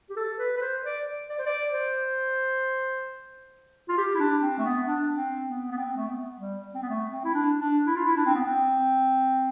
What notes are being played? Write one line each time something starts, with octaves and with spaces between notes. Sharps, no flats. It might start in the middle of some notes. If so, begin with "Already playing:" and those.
G4
A4
B4
B4
C5
D5
D5
C5
D5
C5
F4
G4
E4
D4
C4
A3
B3
D4
C4
B3
B3
C4
A3
B3
G3
C4
B3
A3
C4
E4
D4
D4
E4
F4
E4
D4
C4
B3
C4